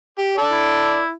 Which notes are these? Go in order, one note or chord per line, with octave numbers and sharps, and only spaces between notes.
G4
A4 D5
E4